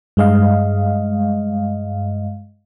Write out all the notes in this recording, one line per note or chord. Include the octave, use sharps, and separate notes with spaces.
G2 G#3 D#5 F5